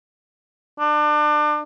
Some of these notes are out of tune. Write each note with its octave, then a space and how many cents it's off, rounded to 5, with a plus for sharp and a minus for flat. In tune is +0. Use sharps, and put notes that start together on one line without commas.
D4 +30